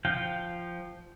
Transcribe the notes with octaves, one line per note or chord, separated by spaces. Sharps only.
F3 F5 G5